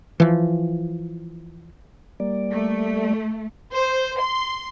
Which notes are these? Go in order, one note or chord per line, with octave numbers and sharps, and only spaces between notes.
E3 F3
G3 A#3 D5
A3
C5
C6